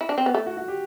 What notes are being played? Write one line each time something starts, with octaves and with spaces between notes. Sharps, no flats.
E4
D4
C4
B3
A3
F#4
F#4
G4